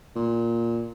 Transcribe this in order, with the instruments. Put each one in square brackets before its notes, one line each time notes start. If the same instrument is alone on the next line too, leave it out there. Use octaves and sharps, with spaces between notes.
[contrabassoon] A#2